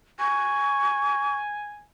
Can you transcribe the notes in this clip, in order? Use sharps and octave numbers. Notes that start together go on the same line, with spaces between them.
G#5 C#6